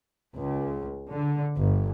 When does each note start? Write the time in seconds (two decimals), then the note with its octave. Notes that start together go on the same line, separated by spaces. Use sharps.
0.36 C#2
1.12 D3
1.57 G1